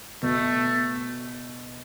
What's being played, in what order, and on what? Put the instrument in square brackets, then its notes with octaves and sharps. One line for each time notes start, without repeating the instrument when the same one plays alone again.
[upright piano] B2 [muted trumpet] A3